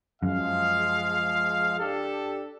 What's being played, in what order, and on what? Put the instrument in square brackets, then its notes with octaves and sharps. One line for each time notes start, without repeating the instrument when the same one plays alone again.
[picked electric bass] F#2 [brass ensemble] F3 G#3 F5
[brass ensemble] D4 G4 A4